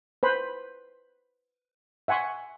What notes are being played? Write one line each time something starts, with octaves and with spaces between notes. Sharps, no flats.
B4 C5 B5
E5 F#5 G#5 C6 C#6